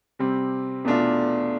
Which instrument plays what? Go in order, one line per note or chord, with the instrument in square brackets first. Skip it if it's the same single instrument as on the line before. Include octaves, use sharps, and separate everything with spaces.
[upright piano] C3 G3 C4
E2 B2 A3 D4 F4